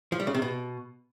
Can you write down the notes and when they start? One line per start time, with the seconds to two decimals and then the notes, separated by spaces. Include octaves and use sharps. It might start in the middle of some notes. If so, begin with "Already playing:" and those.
0.12 F3
0.20 G3
0.27 C#3
0.34 C3
0.42 B2